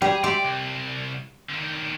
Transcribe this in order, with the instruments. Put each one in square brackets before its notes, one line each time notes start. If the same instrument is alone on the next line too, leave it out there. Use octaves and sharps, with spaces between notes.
[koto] G3 G4 [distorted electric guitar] G#4
[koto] G4 C5 E5 [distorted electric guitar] D5
[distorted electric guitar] C2
D3 D#3